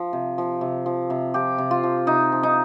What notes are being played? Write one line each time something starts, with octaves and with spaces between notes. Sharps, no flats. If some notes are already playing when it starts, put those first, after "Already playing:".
Already playing: F3
C3
F3
C3
F3
C3
F3 G4
C3
F4
F3
C3 D#4
F3
D#4